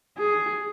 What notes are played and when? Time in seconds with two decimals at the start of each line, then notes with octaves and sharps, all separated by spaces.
0.18 G#4